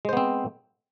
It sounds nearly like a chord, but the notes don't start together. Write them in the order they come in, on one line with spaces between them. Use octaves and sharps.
G#3 C5 B3 C4